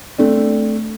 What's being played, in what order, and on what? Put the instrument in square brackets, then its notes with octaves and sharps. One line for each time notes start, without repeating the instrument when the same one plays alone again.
[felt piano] A3 C4 D4